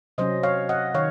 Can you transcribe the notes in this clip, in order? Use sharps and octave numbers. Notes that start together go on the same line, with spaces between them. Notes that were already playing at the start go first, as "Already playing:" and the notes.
C3 F#3 C#4 C5 D#5
C#5 F5
D#5 F#5
D#3 C#5 F5